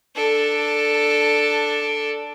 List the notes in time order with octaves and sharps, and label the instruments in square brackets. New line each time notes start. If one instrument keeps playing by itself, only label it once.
[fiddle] D4 A4